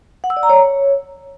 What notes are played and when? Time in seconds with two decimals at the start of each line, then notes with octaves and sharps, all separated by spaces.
0.24 F#5
0.30 E6
0.37 D5
0.43 A#5
0.49 C#5